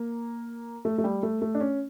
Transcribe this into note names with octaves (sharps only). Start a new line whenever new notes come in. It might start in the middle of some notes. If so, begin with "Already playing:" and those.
Already playing: A#3
A3
A3
G3
A3
A3
D4
C#4